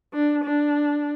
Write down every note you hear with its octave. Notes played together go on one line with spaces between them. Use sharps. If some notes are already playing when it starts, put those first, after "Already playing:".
D4
D4